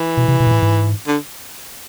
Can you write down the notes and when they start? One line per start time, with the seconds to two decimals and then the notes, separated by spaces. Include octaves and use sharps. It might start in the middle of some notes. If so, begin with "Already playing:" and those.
Already playing: E3
0.17 B2
0.29 C3
0.40 B2
0.47 A#2
0.51 A2
0.63 G#2
1.07 D3